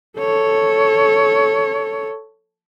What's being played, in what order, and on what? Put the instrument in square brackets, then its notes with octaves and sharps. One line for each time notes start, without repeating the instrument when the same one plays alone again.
[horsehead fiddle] A4 C#5